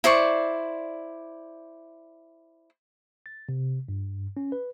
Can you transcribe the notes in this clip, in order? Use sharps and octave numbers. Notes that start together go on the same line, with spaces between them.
E4 C5 D5 C#6
A6
C3
G2
C#4
B4